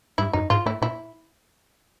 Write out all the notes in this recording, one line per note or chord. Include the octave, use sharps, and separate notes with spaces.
G2 E4
F#2 D#4
G#2 F4
A2 E4
A#2 E4